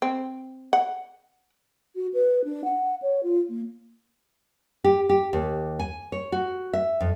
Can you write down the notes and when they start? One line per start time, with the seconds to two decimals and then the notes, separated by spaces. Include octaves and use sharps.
0.02 C4
0.73 F#5
1.96 F#4
2.14 B4
2.45 D4
2.64 F#5
3.02 C#5
3.23 F4
3.49 A#3
4.84 G4
5.09 G4
5.33 D#2
5.79 G#5
6.12 C#5
6.32 F#4
6.73 E5
7.01 F2